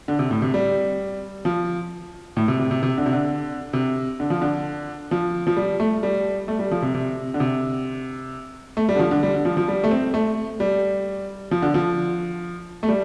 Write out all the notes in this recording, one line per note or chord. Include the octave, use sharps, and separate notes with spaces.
D3
C3
A2
C3
G3
F3
A2
C3
C3
C3
C3
D3
C3
D3
C3
D3
F3
D3
F3
F3
G3
A3
G3
A3
G3
F3
C3
C3
D3
C3
A3
G3
D3
F3
D3
G3
D3
F3
F3
G3
A3
C4
A3
G3
F3
D3
F3
A3
G3